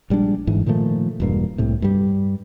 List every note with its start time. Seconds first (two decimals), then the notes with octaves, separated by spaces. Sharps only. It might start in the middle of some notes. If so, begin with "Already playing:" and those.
0.10 A#1 G3 G#3 D4
0.47 G1 G#2 E3
0.66 A#2 D#3 F3 A3
1.20 E1 G2 A#3
1.58 C2 A2 C3
1.82 G2 G3